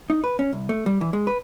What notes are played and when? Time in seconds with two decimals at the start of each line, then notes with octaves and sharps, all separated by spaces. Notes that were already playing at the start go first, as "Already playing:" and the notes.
0.10 D#4
0.24 B4
0.39 C#4
0.53 C2
0.69 A3
0.86 G3
1.01 E3
1.13 G#3
1.27 B4